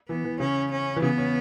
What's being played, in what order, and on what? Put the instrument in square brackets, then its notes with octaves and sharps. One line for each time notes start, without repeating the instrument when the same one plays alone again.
[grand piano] E3 [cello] B3
[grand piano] E3
[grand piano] C#3 [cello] C#4
[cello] C#4
[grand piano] E3
[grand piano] C#3 [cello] B3
[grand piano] C#4